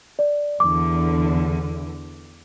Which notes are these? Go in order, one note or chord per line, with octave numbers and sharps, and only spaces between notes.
D5
E2 D3 D6